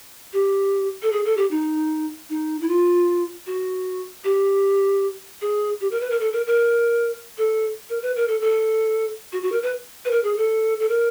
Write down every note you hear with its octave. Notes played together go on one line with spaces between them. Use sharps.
G4
A4
G#4
A4
G4
D#4
D#4
E4
F4
F#4
G4
G#4
G4
A#4
B4
A#4
A4
A#4
A#4
A4
A#4
B4
A#4
A4
A4
F#4
F#4
A#4
B4
B4
A#4
G#4
A4
A4
A#4